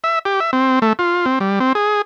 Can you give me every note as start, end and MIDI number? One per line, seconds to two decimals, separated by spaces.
0.04 0.19 76
0.25 0.40 67
0.40 0.51 76
0.53 0.79 60
0.82 0.93 57
0.99 1.25 65
1.26 1.39 60
1.40 1.59 55
1.60 1.73 60
1.75 2.02 68